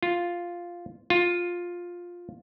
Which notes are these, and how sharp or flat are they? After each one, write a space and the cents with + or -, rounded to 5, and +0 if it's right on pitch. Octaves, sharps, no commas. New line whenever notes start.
F4 +0
F4 +10